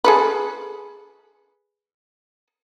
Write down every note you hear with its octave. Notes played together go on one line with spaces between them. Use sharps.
G#4 A4 B4